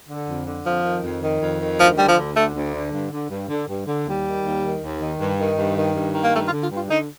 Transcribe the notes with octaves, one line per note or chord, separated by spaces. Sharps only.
D3
F2
D3
F2 F3
D#3
F2
D#3
F2
D#3
D2 F3
D3 G3
F3
D2
D3 A3
D2
D3
G2
D3
G2
D3
G2
D3
D#2 G3
D#3
D#2
D#3
D#2
D#3
G2
D#3
G2
D#3
G2
D#3
A#3
G2 A3
F4
D3
F4
G2
F4
D3 D#4